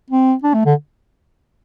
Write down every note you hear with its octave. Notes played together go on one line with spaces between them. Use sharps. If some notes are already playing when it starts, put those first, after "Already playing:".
C4
D4
A3
D3